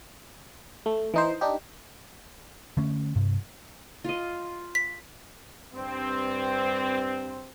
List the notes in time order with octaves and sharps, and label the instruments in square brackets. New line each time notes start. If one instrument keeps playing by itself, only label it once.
[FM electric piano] A3
E3 D#4 C5
D4 D#4 G4
[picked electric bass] D3 A3 C#4
G2 C3
[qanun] F4 D#5
[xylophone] B6
[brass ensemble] G2 C4